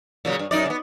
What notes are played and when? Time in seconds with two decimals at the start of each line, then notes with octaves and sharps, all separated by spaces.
0.25 A#2 C#3 F#3
0.39 G2
0.51 F#2 D#4 D5
0.66 C#3 B3